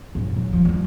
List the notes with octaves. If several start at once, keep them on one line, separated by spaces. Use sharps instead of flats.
A#1 F#2
F#3
F3
G3 F4